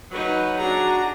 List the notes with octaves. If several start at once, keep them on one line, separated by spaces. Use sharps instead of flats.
F#3 D#4 B4
D4 F#4 G#4 A#5